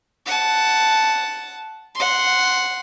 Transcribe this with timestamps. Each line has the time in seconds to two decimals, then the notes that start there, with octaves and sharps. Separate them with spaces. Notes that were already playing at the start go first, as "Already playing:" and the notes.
0.26 F#5 A5
1.95 F#5 C6